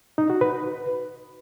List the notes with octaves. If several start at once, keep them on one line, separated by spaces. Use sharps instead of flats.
D#4
F#4
B4